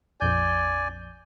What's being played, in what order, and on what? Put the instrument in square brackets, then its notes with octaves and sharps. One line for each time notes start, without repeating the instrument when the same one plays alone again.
[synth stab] A#1 F2 G6 [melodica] D5 G#5